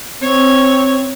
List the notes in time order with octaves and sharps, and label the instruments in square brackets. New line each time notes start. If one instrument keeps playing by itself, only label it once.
[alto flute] C4 [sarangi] C#5